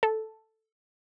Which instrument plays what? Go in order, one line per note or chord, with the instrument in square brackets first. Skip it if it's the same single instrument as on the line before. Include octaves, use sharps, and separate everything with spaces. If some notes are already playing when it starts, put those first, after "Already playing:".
[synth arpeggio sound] A4